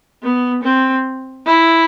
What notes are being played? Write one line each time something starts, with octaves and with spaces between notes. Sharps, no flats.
B3
C4
E4